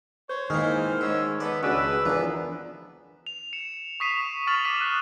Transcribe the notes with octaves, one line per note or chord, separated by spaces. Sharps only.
C5 C#5
D#3 E3 G#3 A#3 F6
G#2 C#4 E6
B3 A4 B4 D5
C#2 B3 D4 F#4 G#4 B4 C#5 E6
E2 E3 F3 B3 D4 A#4
F7
C#7 E7
C#6 D#6 B6 C7 D#7 E7
C#6 F6 A6 B6 D#7 F#7
D6 D#6 F6 B6 E7 F#7
D#6 F#6 D#7